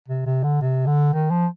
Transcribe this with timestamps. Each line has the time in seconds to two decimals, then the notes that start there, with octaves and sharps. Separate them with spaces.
0.08 C3
0.26 C3
0.43 D3
0.61 C3
0.87 D3
1.14 D#3
1.30 F3